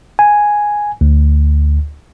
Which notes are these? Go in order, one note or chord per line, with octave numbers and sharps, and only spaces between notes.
G#5
D2